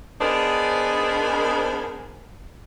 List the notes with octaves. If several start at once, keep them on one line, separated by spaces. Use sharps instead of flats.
B3 D4 D#4 G#4 A#4 C5